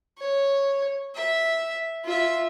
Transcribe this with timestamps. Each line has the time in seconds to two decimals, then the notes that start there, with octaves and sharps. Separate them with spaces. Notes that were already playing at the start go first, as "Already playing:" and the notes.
0.18 C#5
1.15 E5
2.04 F4 E5